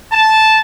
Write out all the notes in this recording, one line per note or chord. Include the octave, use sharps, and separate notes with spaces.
A5